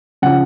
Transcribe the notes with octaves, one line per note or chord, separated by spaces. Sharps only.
C#3 F3 F#5